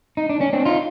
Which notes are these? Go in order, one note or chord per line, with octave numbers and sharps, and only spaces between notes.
D#4
D4
C#4
C4 D4
D#4 F4